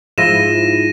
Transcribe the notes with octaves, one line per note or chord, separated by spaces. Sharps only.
G#2 F3 E4 A#6 D#7 E7